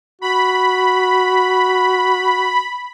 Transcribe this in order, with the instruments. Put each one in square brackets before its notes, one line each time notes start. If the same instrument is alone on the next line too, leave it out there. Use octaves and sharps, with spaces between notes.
[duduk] F#4 [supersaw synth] B5